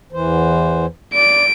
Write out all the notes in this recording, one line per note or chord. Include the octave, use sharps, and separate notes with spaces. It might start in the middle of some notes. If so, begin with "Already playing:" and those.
E2 E3 C5
D5 D7